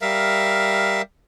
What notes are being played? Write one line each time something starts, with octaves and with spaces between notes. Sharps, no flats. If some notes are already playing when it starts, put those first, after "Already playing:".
G3 A#4 E5 F5